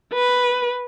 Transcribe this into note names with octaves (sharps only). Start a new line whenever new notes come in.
B4